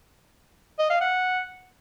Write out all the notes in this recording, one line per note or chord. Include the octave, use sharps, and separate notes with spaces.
D#5
F5
F#5